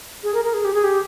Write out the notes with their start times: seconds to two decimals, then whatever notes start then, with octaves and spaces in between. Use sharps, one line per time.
0.23 G#4
0.34 A#4
0.44 A#4
0.54 G#4
0.65 G4
0.74 G#4
0.84 G4